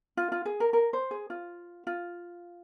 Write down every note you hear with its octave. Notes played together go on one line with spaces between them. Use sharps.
F4
F4
G#4
A#4
A#4
C5
G#4
F4
F4